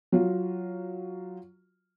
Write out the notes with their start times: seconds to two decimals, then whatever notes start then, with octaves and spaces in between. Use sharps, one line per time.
0.12 F#3 F4